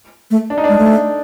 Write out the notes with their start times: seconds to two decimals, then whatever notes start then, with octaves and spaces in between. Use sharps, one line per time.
0.31 A3
0.50 D4
0.58 D#4
0.64 G#3 D4
0.78 A3